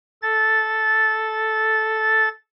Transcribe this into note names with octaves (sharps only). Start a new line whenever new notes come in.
A4 A6